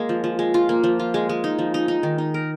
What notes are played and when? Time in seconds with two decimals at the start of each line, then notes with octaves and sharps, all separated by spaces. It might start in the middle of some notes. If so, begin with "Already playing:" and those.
Already playing: G#3 A#3
0.09 F3
0.24 F3
0.39 G#3
0.54 F4
0.69 A#3
0.84 F3
0.99 F4
1.14 G#3
1.29 G#3
1.44 D#4
1.59 F3
1.74 D#4
1.88 D#4
2.03 D#3
2.18 D#4
2.34 A#4